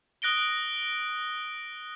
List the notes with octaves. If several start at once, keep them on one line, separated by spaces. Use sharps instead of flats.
D#6 F#6 A#6 D7 G7